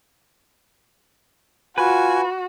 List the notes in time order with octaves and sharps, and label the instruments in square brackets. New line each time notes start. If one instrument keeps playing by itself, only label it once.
[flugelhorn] F4 [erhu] F#4 [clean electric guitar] B4 [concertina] G#5